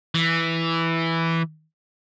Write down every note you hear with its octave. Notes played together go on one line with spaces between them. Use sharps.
E3